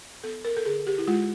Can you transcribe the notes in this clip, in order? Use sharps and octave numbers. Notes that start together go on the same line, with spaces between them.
B3 A4
A#4
A4
D3 G#4
G4
E4
G#3 F4